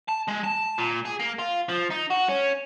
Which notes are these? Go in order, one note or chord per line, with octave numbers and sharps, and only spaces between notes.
A5
G#3
A5
A#2
G#4
A#3
F4
F3
D#4
F#4
C#4